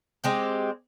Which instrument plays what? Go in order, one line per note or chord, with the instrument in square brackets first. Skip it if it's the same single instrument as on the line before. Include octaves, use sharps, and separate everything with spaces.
[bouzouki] G#3 C4 G4